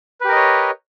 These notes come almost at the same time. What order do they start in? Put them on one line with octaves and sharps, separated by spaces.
B4 G4 A#4 D#5 C#5